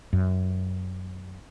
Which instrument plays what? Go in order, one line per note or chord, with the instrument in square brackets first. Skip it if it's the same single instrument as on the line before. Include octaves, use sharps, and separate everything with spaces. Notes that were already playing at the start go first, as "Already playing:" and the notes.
[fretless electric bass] F#2